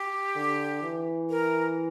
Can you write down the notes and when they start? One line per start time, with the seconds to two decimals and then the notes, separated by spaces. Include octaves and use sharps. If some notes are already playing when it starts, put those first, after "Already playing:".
Already playing: G4
0.36 D3
0.83 E3
1.30 A#4